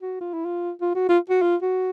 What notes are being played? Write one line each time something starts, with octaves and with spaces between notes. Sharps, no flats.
F#4
F4
E4
F4
F4
F#4
F4
F#4
F4
F#4